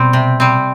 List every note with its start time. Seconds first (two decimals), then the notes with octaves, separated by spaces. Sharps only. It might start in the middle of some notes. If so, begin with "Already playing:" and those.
Already playing: B2 G3 C4
0.13 C3
0.40 G3 C4